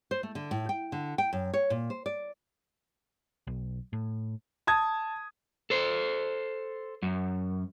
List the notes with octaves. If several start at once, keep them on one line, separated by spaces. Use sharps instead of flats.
C5
A3
D3
A2
G5
D3
G5
F#2
C#5
A#2
C5
D5
B1
A2
A5 D#6 G#6
A4 C5
F#2